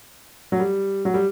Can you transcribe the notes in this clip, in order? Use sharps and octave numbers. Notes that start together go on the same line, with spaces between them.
F#3
G3
F#3
G3